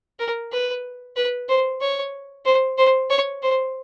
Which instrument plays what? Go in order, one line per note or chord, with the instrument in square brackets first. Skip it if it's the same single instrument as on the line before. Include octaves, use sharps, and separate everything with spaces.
[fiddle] A#4
B4
B4
C5
C#5
C5
C5
C#5
C5